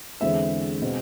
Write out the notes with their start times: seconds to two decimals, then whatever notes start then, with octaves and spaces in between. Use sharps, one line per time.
0.21 E2 D3 G#3 C4 E5
0.81 B2 G#3 C4